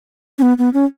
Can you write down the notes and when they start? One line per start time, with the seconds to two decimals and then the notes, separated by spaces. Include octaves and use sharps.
0.39 C#4
0.42 B3
0.58 B3
0.74 C#4